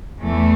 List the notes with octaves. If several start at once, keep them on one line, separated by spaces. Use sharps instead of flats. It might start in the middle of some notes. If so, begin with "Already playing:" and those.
E2 E3 A3